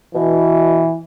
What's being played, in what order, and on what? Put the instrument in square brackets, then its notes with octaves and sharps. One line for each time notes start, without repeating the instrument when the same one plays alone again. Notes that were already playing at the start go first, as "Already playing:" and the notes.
[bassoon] B2 [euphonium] E3